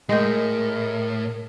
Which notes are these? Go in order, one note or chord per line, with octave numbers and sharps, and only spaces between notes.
A2 G#3 A#4 D#5 G5